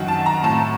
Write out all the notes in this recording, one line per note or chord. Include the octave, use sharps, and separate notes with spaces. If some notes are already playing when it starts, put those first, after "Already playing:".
Already playing: F#2 D#3 F#5
A5
A#5
A2 A5